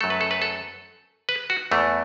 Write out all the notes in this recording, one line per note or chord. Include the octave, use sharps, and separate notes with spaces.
F#2 F#3 A3 A4
B4
A4
B4
A4
B4
F#4
E2 E3 A3